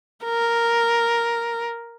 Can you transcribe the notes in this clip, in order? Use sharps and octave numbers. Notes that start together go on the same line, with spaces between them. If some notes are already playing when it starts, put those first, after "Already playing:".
A#4